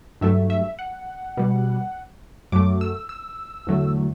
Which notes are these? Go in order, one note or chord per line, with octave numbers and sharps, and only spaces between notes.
G2 F#3 A3 E5
E5
F#5
B2 G3
F#2 F#3 A3 D6
E6
E6
E2 D3 F#3 A3